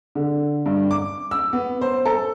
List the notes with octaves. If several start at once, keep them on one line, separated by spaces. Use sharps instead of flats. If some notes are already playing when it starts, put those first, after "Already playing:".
D3
G2
D6
E6
B3
C5
A4